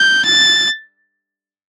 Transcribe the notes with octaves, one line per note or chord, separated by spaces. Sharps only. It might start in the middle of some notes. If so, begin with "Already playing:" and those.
Already playing: G6
A6